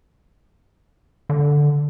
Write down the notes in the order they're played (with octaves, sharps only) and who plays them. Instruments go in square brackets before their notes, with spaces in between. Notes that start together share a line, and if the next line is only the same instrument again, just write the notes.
[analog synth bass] D3